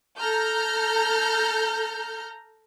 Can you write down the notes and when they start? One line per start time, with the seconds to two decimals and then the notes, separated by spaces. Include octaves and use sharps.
0.18 A4 A#5 F6 G6